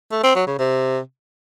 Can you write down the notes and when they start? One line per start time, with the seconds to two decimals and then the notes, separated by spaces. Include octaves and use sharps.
0.12 A3
0.24 C4
0.35 F#3
0.47 C#3
0.59 C3